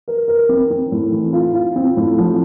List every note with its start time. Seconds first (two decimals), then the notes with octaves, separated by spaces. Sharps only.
0.08 A#4
0.28 A#4
0.49 C4
0.70 C4
0.92 A2
1.12 E3
1.33 F4
1.54 F4
1.76 C4
1.97 A2
2.18 F3